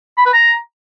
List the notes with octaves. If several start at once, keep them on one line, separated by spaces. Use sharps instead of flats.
B5
B4
A#5